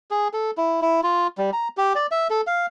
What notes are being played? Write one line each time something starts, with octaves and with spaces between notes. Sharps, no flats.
G#4
A4
E4
E4
F4
G3
A#5
G4
D5
E5
A4
F5